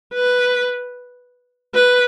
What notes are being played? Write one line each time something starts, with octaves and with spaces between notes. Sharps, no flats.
B4
B4